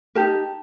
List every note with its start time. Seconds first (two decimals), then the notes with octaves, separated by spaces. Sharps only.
0.15 D#4 G4 A#4 A5